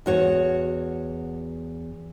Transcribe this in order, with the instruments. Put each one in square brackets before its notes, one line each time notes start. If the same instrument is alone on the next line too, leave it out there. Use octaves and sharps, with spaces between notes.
[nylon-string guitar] E2 F#4 C#5